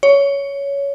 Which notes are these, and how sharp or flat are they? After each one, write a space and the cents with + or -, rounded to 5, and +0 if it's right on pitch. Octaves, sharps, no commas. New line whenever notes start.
C#5 +15